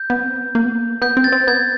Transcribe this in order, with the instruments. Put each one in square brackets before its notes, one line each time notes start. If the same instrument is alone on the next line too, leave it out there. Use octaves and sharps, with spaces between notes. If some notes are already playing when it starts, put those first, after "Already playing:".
Already playing: [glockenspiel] G6
[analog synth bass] B3
C4
B3
A#3
B3
A#3
[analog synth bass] B3 [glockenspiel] G6
[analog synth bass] C4
[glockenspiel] A6
[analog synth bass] C4
[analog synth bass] B3 [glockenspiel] G#6